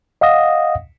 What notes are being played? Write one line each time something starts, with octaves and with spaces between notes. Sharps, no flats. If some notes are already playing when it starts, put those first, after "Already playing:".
D#5 F5 F#5 D#6 A#6